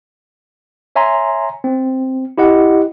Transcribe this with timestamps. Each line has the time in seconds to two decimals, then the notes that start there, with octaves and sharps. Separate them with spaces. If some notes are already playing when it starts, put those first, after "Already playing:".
0.96 C#5 E5 G#5 A#5 C6
1.64 C4
2.38 E4 G4 D#5 F#5